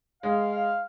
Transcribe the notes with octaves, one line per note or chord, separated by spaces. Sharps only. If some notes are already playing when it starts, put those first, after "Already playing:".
G#3 F5